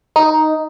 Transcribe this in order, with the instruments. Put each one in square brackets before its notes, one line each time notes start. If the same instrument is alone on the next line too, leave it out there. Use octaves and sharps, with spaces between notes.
[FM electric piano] D#4